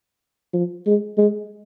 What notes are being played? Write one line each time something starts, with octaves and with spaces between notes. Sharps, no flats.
F3
G#3
G#3